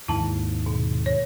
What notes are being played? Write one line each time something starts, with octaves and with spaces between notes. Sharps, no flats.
D#2 G#2 A#3 E4 A5
B2
C#5